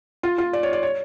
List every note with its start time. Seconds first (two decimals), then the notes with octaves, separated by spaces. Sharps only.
0.23 F4
0.38 F4
0.53 D5
0.63 C#5
0.73 D5
0.83 C#5